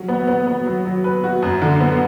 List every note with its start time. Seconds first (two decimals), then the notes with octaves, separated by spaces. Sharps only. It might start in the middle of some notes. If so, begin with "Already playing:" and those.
Already playing: F#3
0.08 B3
0.27 B3
0.47 B3
0.66 F#3
0.85 F#3
1.04 B4
1.24 F#4
1.42 F#2
1.62 D3
1.81 B3